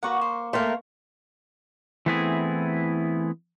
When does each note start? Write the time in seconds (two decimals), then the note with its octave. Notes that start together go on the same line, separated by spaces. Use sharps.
0.03 A#3 F#4 B4 F#5 C#6
0.21 C5
0.53 A3 A#3 F5 G5 C6
2.06 E3 A3 B3 C4 E4 G#4